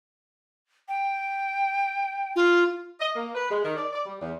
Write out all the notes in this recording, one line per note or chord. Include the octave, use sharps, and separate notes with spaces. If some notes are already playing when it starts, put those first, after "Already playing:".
G5
F4
D#5
A#3
B4
G#3
D#3
D5
D5
G3
E2